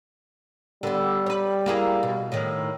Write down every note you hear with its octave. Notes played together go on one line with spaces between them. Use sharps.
D3 G3 B3
B4 C#5
A#3 E4 G#4
B2
A2 D#3